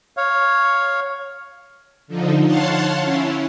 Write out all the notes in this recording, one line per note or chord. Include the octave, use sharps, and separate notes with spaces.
C#5 F5
D3 F3 D#4
C#5 F5 F#5 A5 C6
C#4 E4